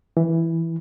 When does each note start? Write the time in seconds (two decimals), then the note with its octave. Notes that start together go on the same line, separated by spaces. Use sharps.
0.17 E3